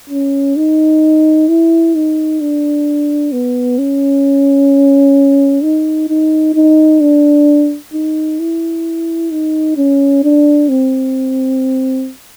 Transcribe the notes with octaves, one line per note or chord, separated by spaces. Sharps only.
C#4
D#4
E4
D#4
D4
B3
C#4
D#4
D#4
D#4
D4
D#4
E4
D#4
C#4
D4
C4